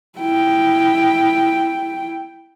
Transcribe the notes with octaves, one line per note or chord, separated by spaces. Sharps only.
E4 G5